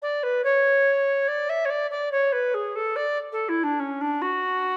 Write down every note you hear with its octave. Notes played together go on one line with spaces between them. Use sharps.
D5
B4
C#5
D5
E5
C#5
D5
D5
C#5
B4
G#4
A4
D5
A4
E4
D4
C#4
D4
F#4